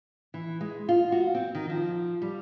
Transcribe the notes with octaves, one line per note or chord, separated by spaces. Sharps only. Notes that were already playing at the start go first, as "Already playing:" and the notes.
E3
G#3
F4
F#4
C4
D#3
F3
G3